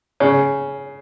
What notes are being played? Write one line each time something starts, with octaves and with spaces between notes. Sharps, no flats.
C#3